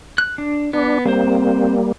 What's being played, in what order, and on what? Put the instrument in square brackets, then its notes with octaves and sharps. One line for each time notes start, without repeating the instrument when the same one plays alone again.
[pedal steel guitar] F#6
D4
[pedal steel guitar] B3 [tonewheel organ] D4
[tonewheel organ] G3 A#3 [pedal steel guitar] C4 C5